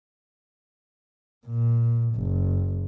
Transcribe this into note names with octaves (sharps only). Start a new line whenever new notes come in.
A#2
F#1